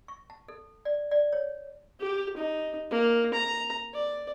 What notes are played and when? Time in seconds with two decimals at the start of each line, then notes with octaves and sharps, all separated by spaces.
0.08 C#6
0.30 A5
0.48 A4
0.85 D5
1.11 D5
1.33 C#5
2.00 G4
2.37 D#4
2.91 A#3
3.34 A#5
3.94 D5